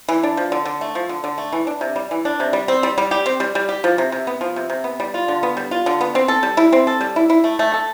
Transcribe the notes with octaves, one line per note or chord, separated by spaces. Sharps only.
E3
D4
F3
D3
D3
A3
F3
D3
D3
A3
E3
D4
C3
G3
E3
D4
C3
G3
C4
G3
G3
G4
C4
G3
G3
G4
F3
C3
C3
B3
F3
C3
C3
B3
G3
F4
D3
B3
G3
F4
D3
B3
C4
A4
G3
E4
C4
A4
G3
E4
E4
A3
A3
A4